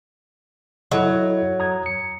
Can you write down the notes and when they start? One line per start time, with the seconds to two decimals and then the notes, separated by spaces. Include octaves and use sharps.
0.91 F#3 E4 A4 D#5
1.60 A#5 D#6 G#6
1.86 C#7